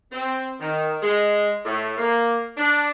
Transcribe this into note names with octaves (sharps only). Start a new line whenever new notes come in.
C4
D#3
G#3
A2
A#3
D4